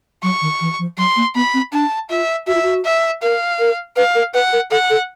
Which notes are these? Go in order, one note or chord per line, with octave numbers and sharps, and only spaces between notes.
F#3 C#6
D#3
E3
F3
F#3 C6
A#3
B3 B5
C4
D4 A5
F4 E5
F#4 E5
F4
F#4
E5
A#4 F5
A#4
B4 F5
A#4
B4 F#5
A#4
A4 F#5
A4